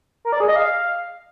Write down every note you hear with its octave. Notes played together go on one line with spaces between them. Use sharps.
A#4
D5
G#4
D#5
F5